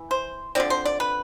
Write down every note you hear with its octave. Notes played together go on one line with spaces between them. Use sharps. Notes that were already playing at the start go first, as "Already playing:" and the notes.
Already playing: E3
C5
D3 F3 C4 D5
C5
D5
B4